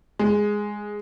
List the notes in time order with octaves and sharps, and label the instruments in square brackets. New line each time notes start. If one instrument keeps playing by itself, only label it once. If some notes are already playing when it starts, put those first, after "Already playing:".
[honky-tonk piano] G#3